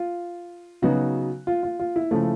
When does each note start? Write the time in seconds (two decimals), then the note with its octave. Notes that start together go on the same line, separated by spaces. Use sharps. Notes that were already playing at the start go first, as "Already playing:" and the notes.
Already playing: F4
0.82 C#3 F#3 B3 D#4 F#4
1.47 F4
1.63 F4
1.80 F4
1.96 E4
2.11 C#3 F3 A3